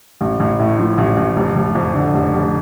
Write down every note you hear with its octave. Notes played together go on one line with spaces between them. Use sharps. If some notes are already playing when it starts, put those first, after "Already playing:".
A1
A1
A2
F3
A1
A1
F1
F1
F2
D3
F1
F1